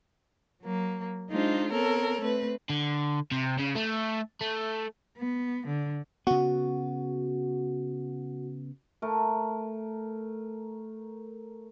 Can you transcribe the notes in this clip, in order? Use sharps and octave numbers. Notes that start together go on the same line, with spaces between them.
F#3 A#3
G#3 D4 D#4 F4 C5
B3 C4 A4 A#4 C#5
A3 C4 B4
D3
C3
C#3
A3
A3
B3
D3
C#3 B3 F#4
A3 A#4